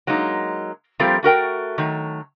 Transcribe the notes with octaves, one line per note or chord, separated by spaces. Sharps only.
F#3 G#3 A#3 D#4
F3 G3 A3 C4 F4 A#4
A3 F#4 A#4 G5
D#3 F#3 A3